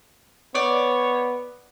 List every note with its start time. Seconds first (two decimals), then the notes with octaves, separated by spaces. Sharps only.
0.55 B3 C#5 D5